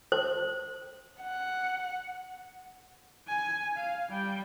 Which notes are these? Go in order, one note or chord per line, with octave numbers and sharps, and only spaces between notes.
C5
F#5
G#5
F5
G3 G5